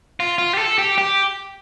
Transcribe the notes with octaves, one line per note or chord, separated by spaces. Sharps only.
F4
F4
G4
A4
G4
G4